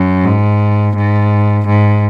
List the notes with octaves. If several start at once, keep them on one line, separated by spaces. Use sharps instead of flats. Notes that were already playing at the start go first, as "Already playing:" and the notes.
Already playing: F#2
G#2
G#2
G#2